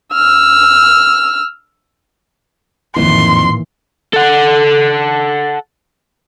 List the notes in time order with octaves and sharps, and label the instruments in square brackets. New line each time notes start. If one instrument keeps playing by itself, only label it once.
[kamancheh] E6 F6
[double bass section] A1 A#2 E3 [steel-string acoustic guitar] F2 [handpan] D#3 A#3 E4 [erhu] C6
[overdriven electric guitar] A4 F#5